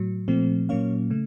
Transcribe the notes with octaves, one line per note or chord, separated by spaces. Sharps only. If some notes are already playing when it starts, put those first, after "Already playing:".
Already playing: A2 F#3
A#2 F3 A3 C4
A#2 F#3 A#3 C#4 C#5 F5
C#3 A3